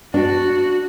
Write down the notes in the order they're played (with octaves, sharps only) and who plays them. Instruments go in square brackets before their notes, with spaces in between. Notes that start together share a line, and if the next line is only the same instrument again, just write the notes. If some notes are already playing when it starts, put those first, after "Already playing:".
[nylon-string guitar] D4 [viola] F#4